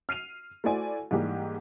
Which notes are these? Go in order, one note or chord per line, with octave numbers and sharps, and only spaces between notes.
F6 C7 D#7 F7
A3 E4 F#4 C5 D5 G#5
G#2 E3 G3 A#3 G4